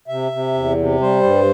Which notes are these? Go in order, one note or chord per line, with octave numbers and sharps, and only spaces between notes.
C3 E5
C3
E2
C3
G3 C5
G2